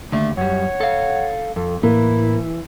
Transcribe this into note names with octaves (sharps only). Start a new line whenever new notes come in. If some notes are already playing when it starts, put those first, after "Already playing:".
D#2 D3 A3
F#2 G3 C#5 F#5
A4 F5
F2 A4
A2 E3 A#3 E4